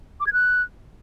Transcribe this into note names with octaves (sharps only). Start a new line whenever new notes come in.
D6
G#6
F#6